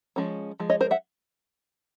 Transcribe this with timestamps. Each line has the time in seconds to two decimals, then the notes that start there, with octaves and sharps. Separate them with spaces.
0.16 F3 G#3 C#4
0.60 F3 G#3
0.70 C#5 D#5
0.81 A#4 C5
0.91 E5 F#5